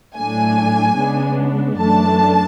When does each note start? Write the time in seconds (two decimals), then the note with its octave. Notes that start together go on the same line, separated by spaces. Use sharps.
0.16 A2 F#3 A3 D4 G#5
0.98 C#3 G#3 B3 D4
1.79 F#2 E3 A3 D4 A5